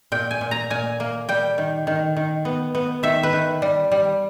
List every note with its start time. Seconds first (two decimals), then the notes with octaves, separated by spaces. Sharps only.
0.12 A#2 G5
0.31 G#5
0.41 A#2
0.51 A#5
0.70 A#2 G#5
1.00 A#3
1.29 G3 G5
1.58 D#3
1.87 D#3
2.17 D#3
2.45 B3
2.75 B3
3.03 D#3 E5
3.23 B4
3.33 D#3
3.62 G3
3.92 G3